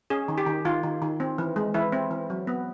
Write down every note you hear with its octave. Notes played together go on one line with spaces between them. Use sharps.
C#4 G#4
D#3
G4
D#3
D#3 F4
D#3
D#3
C4
E3
G#3
E3 E4
C4
E3
F#3
B3